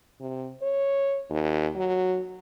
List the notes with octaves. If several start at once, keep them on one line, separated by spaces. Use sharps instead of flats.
C3
C#5
D#2
F#3